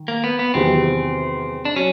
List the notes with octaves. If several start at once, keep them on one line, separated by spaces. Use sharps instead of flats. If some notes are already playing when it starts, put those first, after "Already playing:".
Already playing: D#3
A#3
B3
B3
E2 C3 D#3 F#3 C4
D4
F#3 C#4